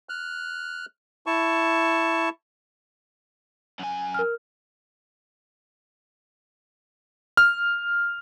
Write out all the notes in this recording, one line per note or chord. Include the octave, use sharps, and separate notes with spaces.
F6 F#6
E4 A5 C#6
F#2 G#5
A#4 F6
F6